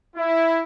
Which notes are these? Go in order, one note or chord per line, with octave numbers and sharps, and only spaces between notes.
E4